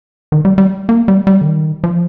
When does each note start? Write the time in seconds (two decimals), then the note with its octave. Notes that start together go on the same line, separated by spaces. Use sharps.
0.32 D#3
0.45 G3
0.58 G3
0.89 A#3
1.08 G3
1.27 G3
1.41 D3
1.46 D#3
1.84 F3